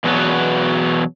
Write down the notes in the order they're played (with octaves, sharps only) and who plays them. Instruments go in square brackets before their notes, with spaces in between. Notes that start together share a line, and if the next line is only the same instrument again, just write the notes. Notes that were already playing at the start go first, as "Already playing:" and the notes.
[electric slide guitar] E2 B2 F#3 B3